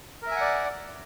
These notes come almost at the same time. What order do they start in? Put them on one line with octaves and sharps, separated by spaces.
A#4 E5 G#5 F#5 D5